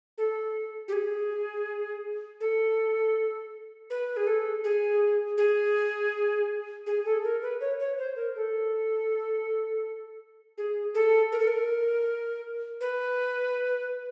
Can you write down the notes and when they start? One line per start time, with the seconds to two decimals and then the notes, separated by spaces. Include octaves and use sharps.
0.18 A4
0.88 G4
0.93 G#4
2.41 A4
3.90 B4
4.17 G#4
4.27 A4
4.64 G#4
5.38 G#4
6.87 G#4
7.05 A4
7.24 A#4
7.42 B4
7.60 C#5
7.80 C#5
7.98 C5
8.16 A#4
8.36 A4
10.58 G#4
10.95 A4
11.32 A#4
11.39 A4
11.48 A#4
12.81 B4